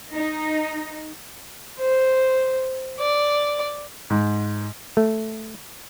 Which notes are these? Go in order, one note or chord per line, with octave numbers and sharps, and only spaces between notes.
D#4
C5
D5
G#2
A3